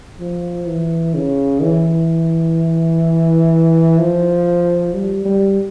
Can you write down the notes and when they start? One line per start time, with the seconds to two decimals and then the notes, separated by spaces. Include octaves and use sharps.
0.20 F3
0.67 E3
1.15 C#3
1.61 E3
3.98 F3
4.94 G3
5.25 G3